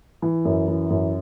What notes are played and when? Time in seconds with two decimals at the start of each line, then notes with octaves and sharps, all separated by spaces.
0.22 E3
0.45 F#2
0.68 E3
0.90 F#2